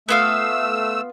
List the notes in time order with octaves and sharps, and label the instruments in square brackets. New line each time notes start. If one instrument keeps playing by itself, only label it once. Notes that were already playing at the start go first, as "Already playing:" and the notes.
[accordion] A3 E6 [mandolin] B3 F4 F5